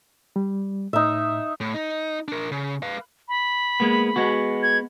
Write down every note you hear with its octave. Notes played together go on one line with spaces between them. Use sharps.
G3
A2 D#4 E5
A2
D#4
D4 A#4
C#3
B4 F5
B5
G#3 A#3 B3
G#3 B3 F#4
G#6